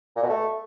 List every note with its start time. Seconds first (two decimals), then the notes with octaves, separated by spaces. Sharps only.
0.16 A#2
0.23 B2
0.29 A3